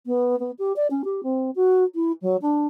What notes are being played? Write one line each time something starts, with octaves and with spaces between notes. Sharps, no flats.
B3
B3
G4
D5
C#4
G4
C4
F#4
E4
F#3
D4